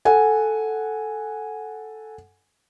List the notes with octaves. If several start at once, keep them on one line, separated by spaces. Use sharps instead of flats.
A4 F#5 G#5